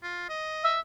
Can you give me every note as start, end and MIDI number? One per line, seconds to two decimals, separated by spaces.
0.03 0.25 65
0.29 0.74 75
0.63 0.80 76